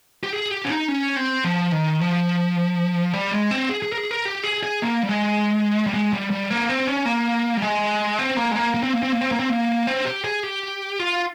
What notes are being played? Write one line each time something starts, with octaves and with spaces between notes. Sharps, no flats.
G4
G#4
G4
C#4
D#4
C#4
C4
F3
D#3
F3
G3
G#3
C4
G#4
G#4
A#4
G#4
A#4
G4
G#4
G#4
A#3
G3
G#3
G3
G#3
G3
G3
A#3
C4
C#4
A#3
G3
G#3
C4
A#3
G#3
A#3
A#3
C4
A#3
C4
A#3
C4
A#3
C4
A#3
C4
G4
G#4
G4
F4